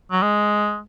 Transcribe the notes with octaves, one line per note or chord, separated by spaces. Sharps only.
F#3
G#3